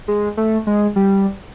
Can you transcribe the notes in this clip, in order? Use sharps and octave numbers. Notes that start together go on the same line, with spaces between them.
G#3
A3
G#3
G3